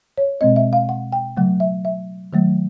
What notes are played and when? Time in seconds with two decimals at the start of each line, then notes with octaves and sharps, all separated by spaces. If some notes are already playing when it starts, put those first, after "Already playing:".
0.18 C#5
0.41 B2 G#3 C4 D#5
0.56 E5
0.73 F5
0.89 F#5
1.12 G5
1.37 C#3 F#3 A3 F#5
1.60 E5
1.85 E5
2.33 D#3 F#3 A3